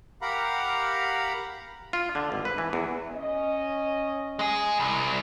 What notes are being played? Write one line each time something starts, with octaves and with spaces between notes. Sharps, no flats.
G4 A#4 F5 F#5 A#5 B5
F4
D3
G#1
B4
E3
E2
C#4 D#5
G#3 G#4
C2